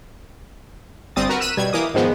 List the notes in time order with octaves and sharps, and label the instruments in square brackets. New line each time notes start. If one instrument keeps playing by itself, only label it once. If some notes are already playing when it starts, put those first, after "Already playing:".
[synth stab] G1 G3 C4 D#6 A6
F#4 A#4 B4
E6 F#6 B6 D#7 E7
B2 G3 G#6
E3 A#3 D6 D#6
G#2 D#3 F3 G#3 B3